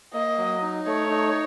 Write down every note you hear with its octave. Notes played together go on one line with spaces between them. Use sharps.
A#3 D#5
F#3
D#4
A3 C#5
D#4